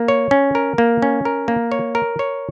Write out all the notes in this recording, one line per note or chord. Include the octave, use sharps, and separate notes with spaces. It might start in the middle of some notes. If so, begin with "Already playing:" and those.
Already playing: A#3
C#5
C#4
A#4
A#3
C#4
A#4
A#3
C#5
A#4
C#5